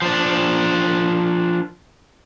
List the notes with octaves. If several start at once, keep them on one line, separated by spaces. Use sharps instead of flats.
F3 D4